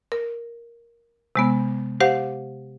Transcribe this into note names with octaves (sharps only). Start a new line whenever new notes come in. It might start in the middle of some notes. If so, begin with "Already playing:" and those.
A#4
C3 G#3 B3
G4 C5 F5 F#5